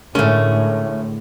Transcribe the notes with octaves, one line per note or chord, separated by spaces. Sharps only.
A2 D3 G#3 A3 C#4 A#4